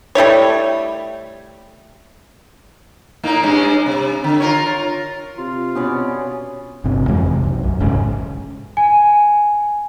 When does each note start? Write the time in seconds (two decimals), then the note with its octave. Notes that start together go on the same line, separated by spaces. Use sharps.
0.15 G3 A3 E4 C#5
3.23 A2 A#3 D#4
3.43 G2 G#3 C#4
3.86 C3
4.24 D3
4.40 F4 A#4 C#5
5.38 C3 F4
5.75 B2 B3 C#4 D5
6.84 G1 C3
7.08 F2 E3 G#3
7.24 C3
7.44 B1
7.63 F#2
7.80 D#1 A1 G#2 C#3
8.77 G#5